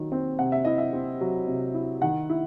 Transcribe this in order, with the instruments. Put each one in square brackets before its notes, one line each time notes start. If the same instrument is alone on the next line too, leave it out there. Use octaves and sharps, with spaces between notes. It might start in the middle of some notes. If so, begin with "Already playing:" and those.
Already playing: [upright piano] D#3 F#3
C4
C3 F#5
E5
E4 D#5
E5
C4
F#3
C3
E4
D#3 F#5
E4